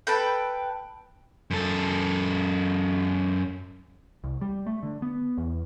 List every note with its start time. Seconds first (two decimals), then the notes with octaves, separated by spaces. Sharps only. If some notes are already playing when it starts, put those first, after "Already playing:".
0.07 A4 B4 G5
1.51 F#2 A4
4.24 C2
4.41 G3
4.67 A3
4.83 D3
5.02 B3
5.38 E2